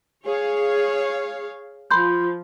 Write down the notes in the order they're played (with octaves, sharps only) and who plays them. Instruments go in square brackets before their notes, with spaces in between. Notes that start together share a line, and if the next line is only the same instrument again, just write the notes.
[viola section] G#4 C#5 F5
[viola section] F3 [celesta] B5 C6 G6